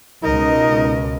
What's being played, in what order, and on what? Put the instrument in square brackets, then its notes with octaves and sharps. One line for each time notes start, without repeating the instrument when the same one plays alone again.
[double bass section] C#2 B2 [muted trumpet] D#4 [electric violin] A#4 D#5